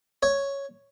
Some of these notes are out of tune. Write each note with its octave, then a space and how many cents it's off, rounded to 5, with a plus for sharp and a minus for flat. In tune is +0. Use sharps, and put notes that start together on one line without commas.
C#5 +0